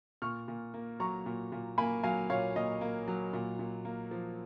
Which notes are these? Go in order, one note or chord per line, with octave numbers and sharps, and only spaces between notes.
A#2 C#6 F6
A#2
A#3
F#3 A#5 C#6
A#2
A#2
A#3 G#5 B5
F#3 F5 G#5
A#2 C#5 F5
A#2 D#5
A#3
F#3
A#2
A#2
A#3
F3